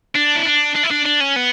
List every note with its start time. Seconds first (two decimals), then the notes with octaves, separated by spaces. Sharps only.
0.16 D4
0.36 E4
0.46 D4
0.76 D4
0.84 E4
0.91 D4
1.06 D4
1.21 C#4
1.36 B3